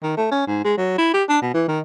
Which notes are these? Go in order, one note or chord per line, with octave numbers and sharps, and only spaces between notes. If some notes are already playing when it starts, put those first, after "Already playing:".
D#3
A3
C#4
G#2
G#3
F#3
E4
G4
D4
B2
E3
D#3